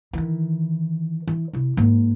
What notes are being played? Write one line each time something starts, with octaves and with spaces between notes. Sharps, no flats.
D#3 E3
E3
C3 E4
G#2 A#3